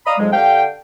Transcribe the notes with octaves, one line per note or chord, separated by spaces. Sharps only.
D5 D#5 F5 A#5 B5 D#6
F2 G#2 F#3 G#3
D3 G4 F5 G5